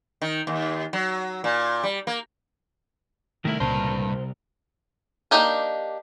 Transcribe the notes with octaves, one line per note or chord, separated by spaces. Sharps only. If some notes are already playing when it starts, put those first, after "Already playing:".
D#3
D#2
F#3
A#2
G3
A#3
C2 D#3 A3 E4 A#4
C#2 G2 A#2 C5
A#3 D4 D#4 G4 A#4